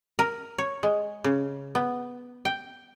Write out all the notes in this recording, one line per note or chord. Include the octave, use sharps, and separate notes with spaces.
A#4
C#5
G#3
C#3
B3
G5